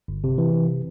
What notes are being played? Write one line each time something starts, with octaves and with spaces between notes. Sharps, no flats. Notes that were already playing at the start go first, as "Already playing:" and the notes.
G1
C3
E3
C3